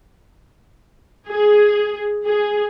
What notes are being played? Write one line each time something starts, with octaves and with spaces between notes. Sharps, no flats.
G#4
G#4